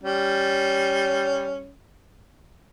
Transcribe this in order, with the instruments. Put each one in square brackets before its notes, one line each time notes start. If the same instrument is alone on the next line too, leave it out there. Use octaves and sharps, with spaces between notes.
[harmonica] G3 C#4